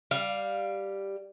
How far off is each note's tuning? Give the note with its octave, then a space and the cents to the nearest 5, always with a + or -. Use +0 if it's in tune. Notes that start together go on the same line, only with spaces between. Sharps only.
G3 +0 F5 +0